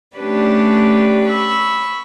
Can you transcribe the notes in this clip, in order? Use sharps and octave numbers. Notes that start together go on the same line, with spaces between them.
A3 C#4 D4 G4 B4 D5
B5 C#6 E6